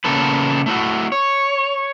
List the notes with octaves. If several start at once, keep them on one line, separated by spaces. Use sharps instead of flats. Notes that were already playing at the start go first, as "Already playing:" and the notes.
C#3 A3 A#3 A4 B4
A3 E4 F#4
C#5